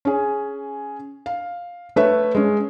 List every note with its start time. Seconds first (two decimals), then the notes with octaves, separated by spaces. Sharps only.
0.05 C#4 G#4
1.26 F5
1.96 A3 B4 C#5 E5
2.35 G#3 C#4